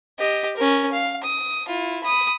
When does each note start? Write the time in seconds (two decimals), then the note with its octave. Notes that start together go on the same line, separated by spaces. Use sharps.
0.19 G4 D#5
0.57 C#4 A#4
0.92 F5
1.23 D#6
1.67 E4 F4
2.04 B5 D#6